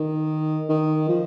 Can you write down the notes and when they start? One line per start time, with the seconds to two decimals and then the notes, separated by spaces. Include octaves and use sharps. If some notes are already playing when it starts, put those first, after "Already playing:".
Already playing: D#3
0.69 D#3
1.09 F3